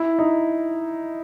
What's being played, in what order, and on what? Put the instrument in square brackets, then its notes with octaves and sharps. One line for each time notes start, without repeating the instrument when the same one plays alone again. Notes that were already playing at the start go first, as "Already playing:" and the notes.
Already playing: [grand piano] E4
D#4